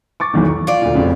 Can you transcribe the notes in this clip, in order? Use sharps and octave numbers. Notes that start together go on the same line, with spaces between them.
C#6 D6 A6
B1 E2 D#3
C#6
F4 D5
D2 A#2
F1 F2 C#3